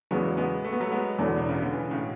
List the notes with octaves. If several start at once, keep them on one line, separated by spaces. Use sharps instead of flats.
E2 C#3 F#3 G#3 B3
G#3 B3
A3
B3
F#3 A3
G#3 B3
E1 E2 D3
B2
C#3
D3
C#3 E3
A2 C#3